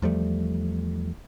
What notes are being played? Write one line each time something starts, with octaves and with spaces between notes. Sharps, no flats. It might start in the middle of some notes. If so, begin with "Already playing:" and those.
E2 F3 G3 A3